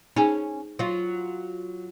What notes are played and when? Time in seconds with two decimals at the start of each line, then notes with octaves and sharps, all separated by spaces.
0.16 C#4 D#4 G#4 G#5
0.79 F#3 F4